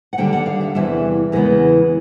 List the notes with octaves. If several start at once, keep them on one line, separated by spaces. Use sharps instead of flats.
F#5
D#2 D3 G3 G5
F#5
F5
E5
E2 C3 E3 G3 E5
E2 C#3 E3 G#3 B3 A#4